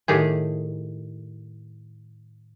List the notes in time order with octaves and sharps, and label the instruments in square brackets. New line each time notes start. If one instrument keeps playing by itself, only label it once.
[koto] A2 D#3 G4 G#4